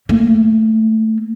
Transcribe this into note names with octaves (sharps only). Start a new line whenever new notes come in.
A3 A#3